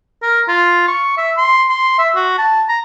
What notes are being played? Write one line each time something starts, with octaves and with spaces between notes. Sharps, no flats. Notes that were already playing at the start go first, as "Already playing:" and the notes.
A#4
F4
C#6
E5
C6
C6
E5
F#4
A5
A#5